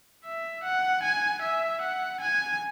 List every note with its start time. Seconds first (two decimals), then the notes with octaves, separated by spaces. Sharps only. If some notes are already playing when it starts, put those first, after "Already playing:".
0.24 E5
0.63 F#5
1.03 G#5
1.42 E5
1.81 F#5
2.20 G#5